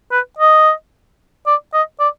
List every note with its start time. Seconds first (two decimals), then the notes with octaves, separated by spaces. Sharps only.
0.12 B4
0.38 D#5
1.47 D5
1.74 D#5
2.00 D5